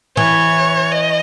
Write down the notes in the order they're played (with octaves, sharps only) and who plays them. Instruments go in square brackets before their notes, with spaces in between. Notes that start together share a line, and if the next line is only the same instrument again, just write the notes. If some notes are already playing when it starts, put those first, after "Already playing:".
[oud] E3 [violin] C#5
[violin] D#5